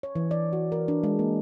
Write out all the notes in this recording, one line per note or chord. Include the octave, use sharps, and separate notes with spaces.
C#5
E3
D5
F#4
A#4
D4
G#3
A#3